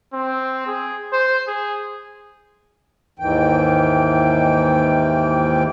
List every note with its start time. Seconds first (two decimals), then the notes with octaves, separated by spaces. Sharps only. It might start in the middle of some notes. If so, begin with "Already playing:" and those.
0.13 C4
0.67 G#4
1.12 C5
1.48 G#4
3.19 D#2 G#2 E3 G5